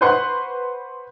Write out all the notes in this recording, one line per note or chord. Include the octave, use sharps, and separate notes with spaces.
B4 C5 F#5 C6 C#6 F#6